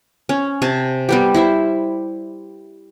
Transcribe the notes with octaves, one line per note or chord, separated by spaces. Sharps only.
C#4
C3 G#5 A5
G3 B3 G4
E4 C5 E5